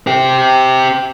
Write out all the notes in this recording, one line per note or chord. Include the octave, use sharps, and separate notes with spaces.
C4 G4